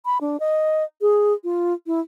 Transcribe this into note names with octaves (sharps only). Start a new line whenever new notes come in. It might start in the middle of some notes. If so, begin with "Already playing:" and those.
B5
D4
D#5
G#4
F4
E4